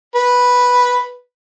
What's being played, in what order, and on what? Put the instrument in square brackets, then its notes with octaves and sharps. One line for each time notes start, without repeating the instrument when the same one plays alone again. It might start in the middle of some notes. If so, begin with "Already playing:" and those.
[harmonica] B4